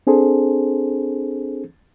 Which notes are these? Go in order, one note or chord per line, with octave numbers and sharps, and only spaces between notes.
C4 D4 G#4 A4 C5